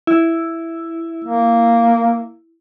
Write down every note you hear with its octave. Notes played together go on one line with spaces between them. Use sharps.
E4
A#3